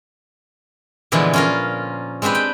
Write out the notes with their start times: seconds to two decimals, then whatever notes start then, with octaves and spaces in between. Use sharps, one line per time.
1.12 A#2 D3 E3 F3 G#3 B3
1.33 C#4 F4 A#4
2.22 G#3 C4 D4 G4 B4
2.35 G5